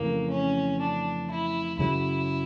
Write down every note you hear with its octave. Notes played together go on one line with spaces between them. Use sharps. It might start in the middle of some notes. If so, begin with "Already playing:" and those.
Already playing: F2 C#3 E3 A3 A#3
C#4
D4
E4
F#2 C#3 F#3 E4